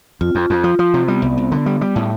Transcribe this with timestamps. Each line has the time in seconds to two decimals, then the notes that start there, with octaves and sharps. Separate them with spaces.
0.21 F2 F4
0.35 F2
0.50 F2
0.64 F3
0.79 F3
0.94 C3
1.08 G3 B3
1.22 C2
1.38 C2
1.52 D3
1.66 G3
1.81 G3
1.95 A2 A3